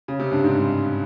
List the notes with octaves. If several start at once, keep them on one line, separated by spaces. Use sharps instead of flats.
C#3
C3
G2
G#2